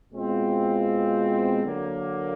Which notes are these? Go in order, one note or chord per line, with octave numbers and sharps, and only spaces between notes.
B2 G#3 C4 F4
D3 F#3 A#3